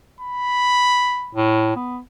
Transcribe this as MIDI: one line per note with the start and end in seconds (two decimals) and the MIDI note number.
0.21 1.37 83
1.35 1.75 45
1.76 1.99 59